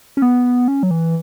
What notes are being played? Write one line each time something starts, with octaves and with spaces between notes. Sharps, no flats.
C#4
B3
C#4
F#3
E3